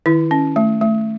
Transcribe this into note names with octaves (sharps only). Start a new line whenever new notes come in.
D#3 E4
C#4
A3
A3